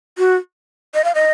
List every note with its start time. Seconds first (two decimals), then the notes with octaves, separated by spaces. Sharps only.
0.18 F#4
0.94 D#5
1.04 F5
1.15 D#5